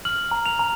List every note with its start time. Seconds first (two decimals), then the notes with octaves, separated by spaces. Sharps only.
0.05 F6 F#7
0.31 A#5
0.46 F7
0.59 A#5